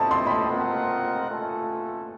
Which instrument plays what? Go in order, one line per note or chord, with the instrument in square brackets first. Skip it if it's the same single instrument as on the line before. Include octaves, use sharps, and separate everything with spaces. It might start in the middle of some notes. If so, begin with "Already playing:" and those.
Already playing: [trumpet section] C#4 E4 A4 C5 D#5 [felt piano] A5
[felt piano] C6
B5
C6
[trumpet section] C4 F4 A#4 D#5 F#5
A3 C#4 F4 A4